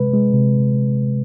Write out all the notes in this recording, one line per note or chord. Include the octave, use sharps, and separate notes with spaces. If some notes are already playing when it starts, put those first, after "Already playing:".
Already playing: C3 G#3 B4
G#3
C3